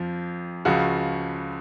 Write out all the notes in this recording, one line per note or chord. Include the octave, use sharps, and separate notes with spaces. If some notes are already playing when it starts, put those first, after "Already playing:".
Already playing: F2 F3
C#2 C#3 F3 F#4